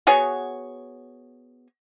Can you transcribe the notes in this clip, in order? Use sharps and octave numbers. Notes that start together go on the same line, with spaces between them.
B3 F#4 G#4 C#5